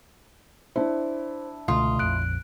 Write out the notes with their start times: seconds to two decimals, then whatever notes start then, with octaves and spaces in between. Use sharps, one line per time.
0.76 D4 E4 C5
1.68 C#2 B2 D3 A3 F4 D#6
1.99 A#1 F2 F#6 D7